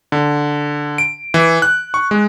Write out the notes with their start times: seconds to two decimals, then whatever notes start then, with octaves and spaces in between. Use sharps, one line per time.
0.12 D3
0.98 D7
1.34 E3
1.62 F#6
1.94 C#6
2.11 G#3